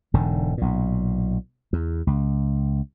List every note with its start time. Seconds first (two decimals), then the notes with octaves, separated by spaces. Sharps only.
0.14 E1 G#2 D3
0.58 B1 A#2
1.73 E2
2.07 C#2